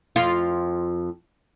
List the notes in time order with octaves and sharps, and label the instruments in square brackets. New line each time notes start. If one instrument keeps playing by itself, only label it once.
[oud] F2 F4